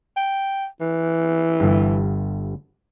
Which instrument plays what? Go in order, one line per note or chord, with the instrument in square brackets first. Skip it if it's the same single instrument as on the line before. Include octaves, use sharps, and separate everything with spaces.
[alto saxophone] G5
E3
[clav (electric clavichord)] G1 G2